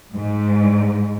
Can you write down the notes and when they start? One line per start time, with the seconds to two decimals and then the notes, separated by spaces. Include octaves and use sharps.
0.13 G#2